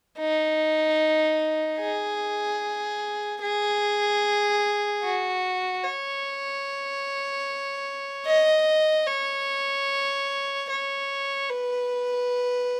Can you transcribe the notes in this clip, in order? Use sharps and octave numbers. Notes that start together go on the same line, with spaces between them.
D#4
G#4
G#4
F#4
C#5
D#5
C#5
C#5
B4